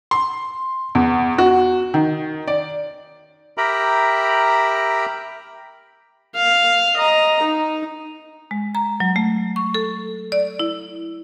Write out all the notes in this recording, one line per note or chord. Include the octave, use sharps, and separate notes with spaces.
C6
E2
F#4
D#3
D5
G4 A#4 E5 G5 A#5 B5
F5
D#5 A#5
D#4
G#3
A#5
F#3
A3
C#6
A4
D5
E4